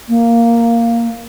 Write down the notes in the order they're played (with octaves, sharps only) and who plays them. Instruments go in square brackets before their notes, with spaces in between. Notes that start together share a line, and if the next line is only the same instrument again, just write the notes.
[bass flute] A#3